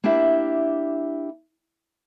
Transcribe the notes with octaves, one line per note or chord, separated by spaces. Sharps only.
A#3 D4 E4 G4 E5